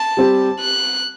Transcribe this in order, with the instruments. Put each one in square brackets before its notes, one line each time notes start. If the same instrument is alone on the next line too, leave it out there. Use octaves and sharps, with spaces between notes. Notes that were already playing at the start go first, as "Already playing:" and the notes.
Already playing: [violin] A5
[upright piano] G3 C4 G4
[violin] F#6